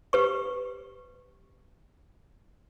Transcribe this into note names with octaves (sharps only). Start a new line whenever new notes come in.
G4 B4 C#6